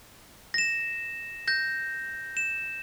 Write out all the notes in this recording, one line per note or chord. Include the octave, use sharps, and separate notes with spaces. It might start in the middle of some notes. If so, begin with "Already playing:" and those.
A#6 E7
G6 A#6
E7